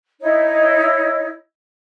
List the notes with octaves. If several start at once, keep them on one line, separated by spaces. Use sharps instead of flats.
D#4 E4 C#5 D#5